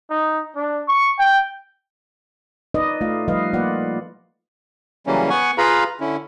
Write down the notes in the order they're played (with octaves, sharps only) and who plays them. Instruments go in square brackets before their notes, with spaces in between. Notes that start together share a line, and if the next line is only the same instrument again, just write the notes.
[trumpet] D#4
D4
C#6
G5
[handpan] D#4 B4 D5 D#5
A3 F4 F5
F3 G3 B4 D#5 F5
F3 A#3 F4 B4 D5 F#5
[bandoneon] C#3 E3 F#3 G3 A#3 C#4
B3 F#5 G#5 C#6
F4 G#4 B4 F5 A#5 B5
D3 C#4 E4